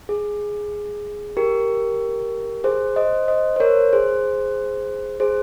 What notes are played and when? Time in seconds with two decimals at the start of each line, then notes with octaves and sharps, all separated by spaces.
0.09 G#4
1.37 G4 A#4
2.64 G#4 C5
2.96 C5 D#5
3.28 C5 D#5
3.56 C5
3.60 A#4 C#5
3.93 G#4 C5
5.20 G#4 C5